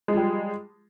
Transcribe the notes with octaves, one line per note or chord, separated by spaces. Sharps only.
F3 G3 G#3